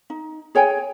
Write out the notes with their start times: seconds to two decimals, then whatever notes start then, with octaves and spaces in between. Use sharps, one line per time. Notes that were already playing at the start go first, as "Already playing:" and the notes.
0.10 D#4
0.55 G#4 C#5 G5 G#5